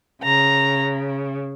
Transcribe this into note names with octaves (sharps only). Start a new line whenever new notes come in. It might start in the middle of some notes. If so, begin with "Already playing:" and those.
C#3 A#5